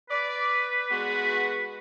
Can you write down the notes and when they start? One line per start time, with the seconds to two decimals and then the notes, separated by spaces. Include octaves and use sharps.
0.10 B4 D5
0.90 G#3 B3 F#4